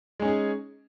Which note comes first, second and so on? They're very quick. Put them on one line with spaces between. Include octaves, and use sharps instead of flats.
G#3 C#4 D#4 G#4